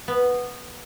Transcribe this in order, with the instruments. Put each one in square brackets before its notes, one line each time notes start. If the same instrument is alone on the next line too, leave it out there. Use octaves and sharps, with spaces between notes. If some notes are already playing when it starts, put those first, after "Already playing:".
[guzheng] B3